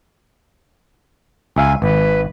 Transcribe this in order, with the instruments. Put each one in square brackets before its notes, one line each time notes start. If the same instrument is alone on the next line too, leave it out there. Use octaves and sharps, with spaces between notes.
[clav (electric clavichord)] C#2 E5 F5 [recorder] G#5
[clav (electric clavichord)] G#1 [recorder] B4